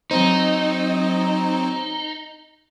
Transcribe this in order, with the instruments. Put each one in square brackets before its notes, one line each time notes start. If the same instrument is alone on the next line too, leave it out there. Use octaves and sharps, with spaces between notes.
[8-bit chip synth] F#3 C4 C5 [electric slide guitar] D#4